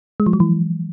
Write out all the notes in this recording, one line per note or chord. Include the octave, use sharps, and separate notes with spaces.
G#3
F3
F#3
E3